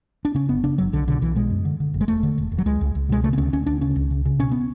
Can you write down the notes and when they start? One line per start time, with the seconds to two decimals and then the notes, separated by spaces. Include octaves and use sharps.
0.25 D4
0.34 C#3 C#4
0.49 F#1 B3
0.64 C#3 D4
0.78 F#1 F#3
0.92 B1 D3
1.07 B2 D3
1.22 B1 E3
1.36 B2 G#3
1.50 F#2
1.65 D3
1.80 D3
1.94 F#1
2.01 G#3
2.08 E1 A3
2.23 D3
2.38 E1
2.52 E1
2.58 F#3
2.65 C#2 G#3
2.81 C#2
2.95 C#2
3.09 B2 G#3
3.24 C#3 A3
3.33 B3
3.38 D2 C#4
3.53 D2 C#4
3.66 D2 D4
3.81 C#3 C#4
3.96 C#2
4.11 C#3
4.25 C#3
4.39 B2 C#4
4.51 B3